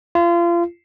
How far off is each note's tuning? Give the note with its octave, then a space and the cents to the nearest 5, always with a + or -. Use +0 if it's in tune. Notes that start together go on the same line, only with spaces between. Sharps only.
F4 -30